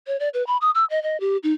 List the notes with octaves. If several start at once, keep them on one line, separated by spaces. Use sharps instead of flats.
C#5
D5
B4
B5
D#6
E6
D#5
D#5
G4
D#4